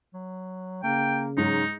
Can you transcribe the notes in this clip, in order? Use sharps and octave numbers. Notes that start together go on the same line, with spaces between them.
F#3
C#3 A#3 G5
G#2 F#3 D#4